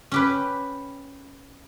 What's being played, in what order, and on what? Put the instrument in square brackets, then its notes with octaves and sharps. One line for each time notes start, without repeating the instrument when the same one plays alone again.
[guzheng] C#4 G4 B4